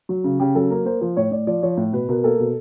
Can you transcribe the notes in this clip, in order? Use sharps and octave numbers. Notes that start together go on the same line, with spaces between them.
F#3
C#3
C#3 G4
F#3 A4
A#3 A#4
A#3 C5
F3 C5
A2 C#5
A2 D5
F3 D5
F3 C#5
A2
B2 B4
B2 A#4
A#3 A4
B2